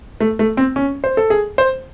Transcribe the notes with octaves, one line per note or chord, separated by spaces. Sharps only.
A3
A3
C4
C#4
C5
A4
G#4
C5